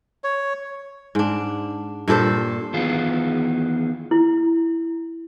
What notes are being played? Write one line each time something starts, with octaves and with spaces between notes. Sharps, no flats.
C#5
G#2 D4
G2 A#2 A4 C5
D#3 E3 B3 F4 G#4
E4